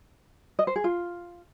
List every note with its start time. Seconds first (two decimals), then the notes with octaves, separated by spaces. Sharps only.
0.59 D#5
0.67 C5
0.76 G#4
0.84 F4